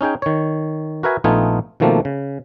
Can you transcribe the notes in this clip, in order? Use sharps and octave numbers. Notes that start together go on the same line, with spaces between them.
C#4 D#4 G#4 G5
D#3 C#5
F#4 A#4 B4 E5 G#5
A#1 A3 B3 D#4 F4 G#5
B2 D#3 F3 A3 A#3 C4
C#3